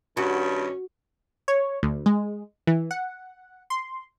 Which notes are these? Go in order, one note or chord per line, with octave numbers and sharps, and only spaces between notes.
G2 D#3 C#4 F#4
C#5
D2
G#3
E3
F#5
C6